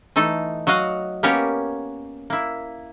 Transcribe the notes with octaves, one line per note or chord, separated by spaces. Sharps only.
E3 A3 D#4 A4
F#3 F#4 D#5 F5 F#5
A#3 B3 C#4 G4 A#4 C#5
A#3 E4